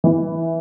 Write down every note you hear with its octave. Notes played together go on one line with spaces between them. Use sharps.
E3